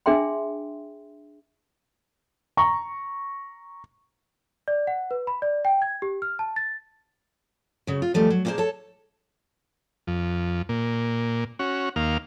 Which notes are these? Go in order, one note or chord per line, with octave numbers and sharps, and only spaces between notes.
D4 G#4 E5 G5 C6
A#5 C#6
D5
F#5
B4
B5
D5
G5
G#6
G4
F6
A5
A6
C#3 F#3
F4
D#3 F3 G3 A3 G4
F#3
A#2 A#3 F4 G#4 C5 A5
A4 C#5 A5
F2
A#2
C#4 F#4
D#2 A#3 F5